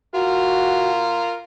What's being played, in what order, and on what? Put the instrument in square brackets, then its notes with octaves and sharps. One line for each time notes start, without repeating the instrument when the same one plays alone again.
[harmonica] F4 A#4 [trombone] F#4